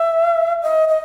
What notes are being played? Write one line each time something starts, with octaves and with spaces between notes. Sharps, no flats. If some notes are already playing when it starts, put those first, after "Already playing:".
Already playing: E5
D#5
D#5